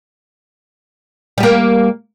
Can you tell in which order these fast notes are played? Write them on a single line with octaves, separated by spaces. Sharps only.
G3 G4 A#3